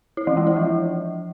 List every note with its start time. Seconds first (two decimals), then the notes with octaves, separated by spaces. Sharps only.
0.17 E4
0.27 E3
0.37 G#3
0.47 E4
0.57 F3